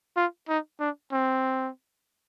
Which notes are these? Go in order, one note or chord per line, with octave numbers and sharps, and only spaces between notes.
F4
D#4
D4
C4